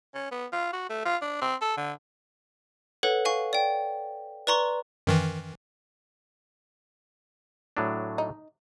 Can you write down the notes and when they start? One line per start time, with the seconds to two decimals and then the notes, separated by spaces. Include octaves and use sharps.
0.14 C#4
0.31 B3
0.53 F4
0.73 F#4
0.89 A3
1.05 F4
1.22 D4
1.41 C4
1.61 A4
1.77 D3
3.03 A4 B4 C#5 F#5
3.25 F5 G#5 C#6
3.53 D5 G5
4.47 B4 D5 A#5 C6 C#6
5.07 F#2 D#3 E3
7.77 A2 F#3 D4
8.18 D#4